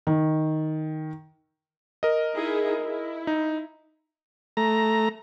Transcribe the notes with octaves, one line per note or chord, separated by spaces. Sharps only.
D#3
A#4 D#5
D#4 E4 G#4
E4
D#4
A3 A#5